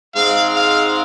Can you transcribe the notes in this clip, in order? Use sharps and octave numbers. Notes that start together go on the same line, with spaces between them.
G#2 G#3 C4 F5
F5